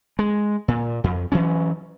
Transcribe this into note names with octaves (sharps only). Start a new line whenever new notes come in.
G#3
A#2
F2
E3 F#3 C#4